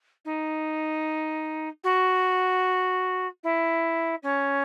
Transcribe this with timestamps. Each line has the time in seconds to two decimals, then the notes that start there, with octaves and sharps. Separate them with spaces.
0.25 D#4
1.84 F#4
3.43 E4
4.23 C#4